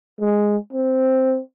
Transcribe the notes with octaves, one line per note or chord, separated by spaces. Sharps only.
G#3
C4